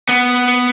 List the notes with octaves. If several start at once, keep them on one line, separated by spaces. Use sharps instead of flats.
B3